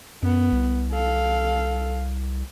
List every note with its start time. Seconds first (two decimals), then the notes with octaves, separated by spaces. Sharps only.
0.23 F#2 B3
0.52 C2
0.93 A4 F5